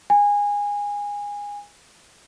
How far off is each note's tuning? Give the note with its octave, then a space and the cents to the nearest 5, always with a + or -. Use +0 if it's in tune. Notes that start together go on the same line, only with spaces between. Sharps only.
G#5 -20